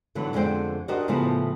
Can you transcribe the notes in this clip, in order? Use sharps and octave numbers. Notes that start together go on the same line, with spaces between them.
A2 D3 E3 F#3 B3
F2 D3 G#3 A4 C5 G5
D4 F#4 G4 A#4 C5 D#5
A2 C#3 F3 A3 B3 C5